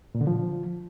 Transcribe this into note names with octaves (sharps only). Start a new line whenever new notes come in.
A#2
D3
F3